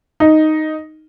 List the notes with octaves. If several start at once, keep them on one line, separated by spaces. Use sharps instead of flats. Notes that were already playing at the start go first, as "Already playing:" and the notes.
D#4